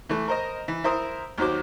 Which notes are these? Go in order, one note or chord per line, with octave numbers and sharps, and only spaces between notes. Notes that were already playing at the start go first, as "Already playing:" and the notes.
E3 A3
A#4 C5 D#5
E3
E4 A#4 C5 C6 D#6
D#2 D#3 F#3 C5 D6